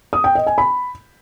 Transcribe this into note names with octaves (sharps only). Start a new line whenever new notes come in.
D#6
G5
D#5
G#5
B5